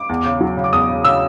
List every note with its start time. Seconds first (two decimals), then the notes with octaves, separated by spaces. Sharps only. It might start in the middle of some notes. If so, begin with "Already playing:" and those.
Already playing: D6
0.09 E2
0.25 C#3
0.41 F#3
0.57 C#3
0.64 D6
0.73 E2 D#6
0.89 C#3
1.05 C#3 E6